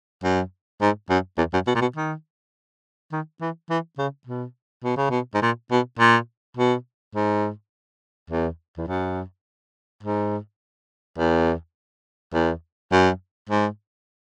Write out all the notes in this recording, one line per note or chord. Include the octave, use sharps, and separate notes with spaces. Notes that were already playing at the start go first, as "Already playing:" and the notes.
F#2
G#2
F#2
E2
F#2
B2
A#2
B2
D#3
D#3
E3
E3
C#3
B2
B2
C#3
B2
G#2
A#2
B2
A#2
B2
G#2
E2
E2
F#2
G#2
E2
E2
F#2
G#2